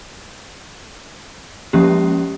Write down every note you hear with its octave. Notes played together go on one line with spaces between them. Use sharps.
F3 G#3 A#3 C#4 G4